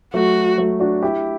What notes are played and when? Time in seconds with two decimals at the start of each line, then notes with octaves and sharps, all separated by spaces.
0.14 F#3 A3 F#4
0.58 F#3 A3
0.80 D4 F#4
1.02 E4 G4